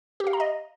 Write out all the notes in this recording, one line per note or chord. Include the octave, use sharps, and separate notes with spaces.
G4
F5
A#5
D#5